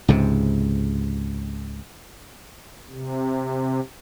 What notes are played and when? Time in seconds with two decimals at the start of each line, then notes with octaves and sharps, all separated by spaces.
0.08 C#2 G#2 C3
2.90 C3